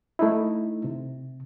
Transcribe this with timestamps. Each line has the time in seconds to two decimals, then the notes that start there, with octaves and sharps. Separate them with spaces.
0.19 A3 D#4 E4
0.84 C3